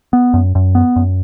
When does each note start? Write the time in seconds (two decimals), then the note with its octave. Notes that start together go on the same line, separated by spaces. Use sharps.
0.13 B3
0.34 F#2
0.55 F#2
0.75 B3
0.96 F#2